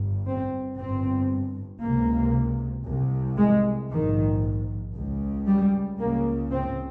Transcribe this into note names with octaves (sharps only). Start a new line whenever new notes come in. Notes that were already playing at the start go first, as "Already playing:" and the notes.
Already playing: G1 G2
C4
G1 G2 C4
C#2 C3 A#3
C2 C3
G#3
A#1 G#2 D#3
C#2 C#3
G3
C#2 C#3 A#3
C4